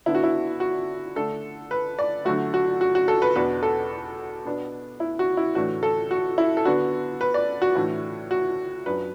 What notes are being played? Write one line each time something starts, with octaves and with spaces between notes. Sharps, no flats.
D3 B3 D4 E4
F#4
E4
F#4
D3 A3 D4 A4
B4
D5
D3 F#3 A3 F#4
F#4
F#4
F#4
A4
B4
E2 B2 B3 D4 B4
A4
B2 B3 D4
E4
F#4
E4
A2 E3 A3 D4 F#4
A4
F#4
E4
A4
D3 B3 D4 F#4
B4
D5
F#4
A2 E3 A3 D4
F#4
F#2 F#3 D4 B4